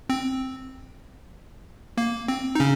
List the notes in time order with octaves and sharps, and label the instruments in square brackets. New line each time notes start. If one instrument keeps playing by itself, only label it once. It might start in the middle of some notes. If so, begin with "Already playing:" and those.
[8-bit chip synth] C4
A#3
C4
D#4
C#3 C#4